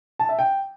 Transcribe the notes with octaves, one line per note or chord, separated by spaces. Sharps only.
A5
E5
G5